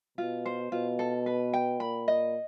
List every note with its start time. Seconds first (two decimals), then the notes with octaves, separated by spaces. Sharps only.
0.18 B2 F4
0.46 C5
0.72 B2 F4
0.99 A4
1.26 B4
1.53 G5
1.80 A#2 B5
2.08 D#5